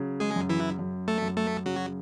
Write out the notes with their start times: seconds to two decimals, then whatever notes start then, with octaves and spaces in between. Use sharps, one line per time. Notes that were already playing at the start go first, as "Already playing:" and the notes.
Already playing: C#3 F#3
0.20 G#3 G#4
0.36 F#2
0.49 E3 E4
0.79 F#2
1.08 A3 A4
1.22 F#2
1.37 A3 A4
1.65 C#3 F#3 F#4